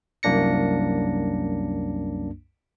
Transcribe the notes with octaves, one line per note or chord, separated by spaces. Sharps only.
C2 F#2 A#3 D4 A#6 C#7